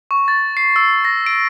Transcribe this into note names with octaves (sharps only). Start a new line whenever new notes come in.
C#6
A6
C7
E6
A#6
D7